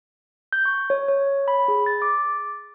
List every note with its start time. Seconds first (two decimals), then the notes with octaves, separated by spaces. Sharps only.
0.53 G6
0.65 C#6
0.90 C#5
1.09 C#5
1.48 B5
1.68 G#4
1.86 A6
2.02 D6